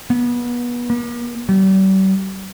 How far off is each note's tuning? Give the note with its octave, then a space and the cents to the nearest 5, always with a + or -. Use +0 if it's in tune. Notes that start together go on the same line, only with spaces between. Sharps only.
B3 -30
A#3 +45
G3 -40